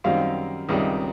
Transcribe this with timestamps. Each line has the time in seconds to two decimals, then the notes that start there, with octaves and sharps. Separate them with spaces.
0.04 F#2 D#3 G3 C4 F5
0.69 C#2 C3 D#3 G3